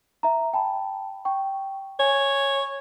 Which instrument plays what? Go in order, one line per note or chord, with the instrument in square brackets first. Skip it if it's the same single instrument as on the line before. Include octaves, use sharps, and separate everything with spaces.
[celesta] E5 A#5
G5 A5 B5
G5 C#6
[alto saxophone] C#5 [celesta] G#5